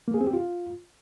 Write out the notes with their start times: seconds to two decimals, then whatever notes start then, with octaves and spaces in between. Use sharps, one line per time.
0.08 A#3
0.14 G#4
0.21 C4
0.27 G4
0.33 F4